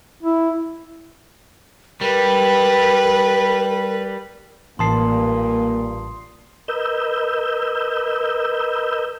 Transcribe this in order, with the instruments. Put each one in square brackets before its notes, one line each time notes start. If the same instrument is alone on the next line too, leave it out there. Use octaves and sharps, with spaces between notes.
[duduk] E4
[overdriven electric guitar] G3 [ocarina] A#4 [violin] B4
[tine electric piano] A1 A5 [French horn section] G2 A#2 [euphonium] A#3 [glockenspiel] C6 D#6 C7
[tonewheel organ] A#4 B4 D#5 E6 G6